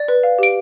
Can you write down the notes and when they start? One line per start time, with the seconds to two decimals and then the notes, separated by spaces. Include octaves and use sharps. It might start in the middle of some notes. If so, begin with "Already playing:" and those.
Already playing: D5
0.08 B4
0.23 F5
0.38 G4 D7